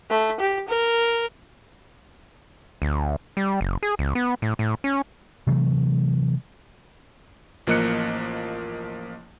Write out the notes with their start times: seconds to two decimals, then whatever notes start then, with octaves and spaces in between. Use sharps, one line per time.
0.10 A3
0.40 G4
0.68 A#4
2.82 D2
3.37 G3
3.61 F#1
3.83 G#4
3.99 C#2
4.15 B3
4.42 A2
4.59 A2
4.84 C#4
5.47 C3 E3 F#3 A3
7.67 A1 F3 A#3 D#5 F#6 C#7